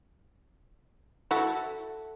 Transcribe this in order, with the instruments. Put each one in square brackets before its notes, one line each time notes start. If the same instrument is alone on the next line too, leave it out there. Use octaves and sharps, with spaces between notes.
[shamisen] E4 F#4 [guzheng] A4